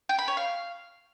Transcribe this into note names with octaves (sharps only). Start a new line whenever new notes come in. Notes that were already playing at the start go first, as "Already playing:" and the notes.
G5
B5
C#5
F5